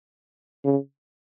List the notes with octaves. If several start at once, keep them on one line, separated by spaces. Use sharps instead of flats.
C#3